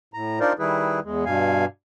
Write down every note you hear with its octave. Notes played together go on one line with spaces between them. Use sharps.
A2 A#5
D4 D#4 F4 A#4 C5 D5
D#3 G3 E4 G#4 B4
E2 G#3
G2 B2 F5 G#5